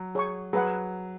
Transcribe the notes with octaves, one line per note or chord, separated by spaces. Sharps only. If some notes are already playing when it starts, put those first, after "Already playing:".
Already playing: F#3
G#4 C#5 G#5 C#6
F#3 G#4 B4 F#5